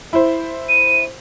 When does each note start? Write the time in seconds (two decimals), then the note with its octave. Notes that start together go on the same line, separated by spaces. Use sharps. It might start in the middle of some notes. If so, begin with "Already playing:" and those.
0.13 E4 C5
0.69 D#7